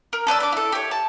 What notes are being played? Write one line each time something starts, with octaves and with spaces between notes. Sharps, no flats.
A#4
A4 B4 D5 E6
D4 D6
E4 A4
G4 C#5
A5